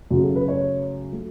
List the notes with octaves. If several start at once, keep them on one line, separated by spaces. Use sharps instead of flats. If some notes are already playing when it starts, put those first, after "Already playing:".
F#2 C#3 F#3 A3 F#4
A4
B4
C#5
F#3 A3